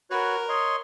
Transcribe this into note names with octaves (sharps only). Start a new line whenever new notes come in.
F#4 A#4 B4 C#5
C#5 D#5 C6